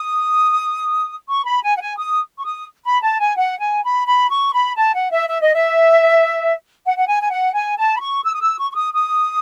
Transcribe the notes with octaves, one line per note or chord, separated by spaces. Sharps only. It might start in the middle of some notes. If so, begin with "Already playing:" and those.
Already playing: D#6
C#6
B5
G#5
F#5
G#5
D#6
C#6
D#6
B5
A5
G#5
F#5
G#5
B5
B5
C#6
B5
A5
F#5
E5
E5
D#5
E5
F#5
F#5
G#5
G#5
F#5
G#5
A5
B5
C#6
E6
D#6
E6
C#6
C#6
D#6
D#6